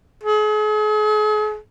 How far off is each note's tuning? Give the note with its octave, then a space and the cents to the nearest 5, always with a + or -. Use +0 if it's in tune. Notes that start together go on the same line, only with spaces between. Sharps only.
G#4 +40